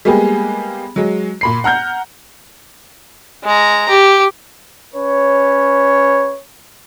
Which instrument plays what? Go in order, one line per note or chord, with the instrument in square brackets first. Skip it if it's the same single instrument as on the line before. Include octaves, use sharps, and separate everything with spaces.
[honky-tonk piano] G3 G#3 A#3 B3 G4 G#4
F#3 G#3
A#2 B5 C7
F#5 A#5 F6 G6
[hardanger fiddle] G#3 A#5
G4
[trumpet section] C#4 B4 C#5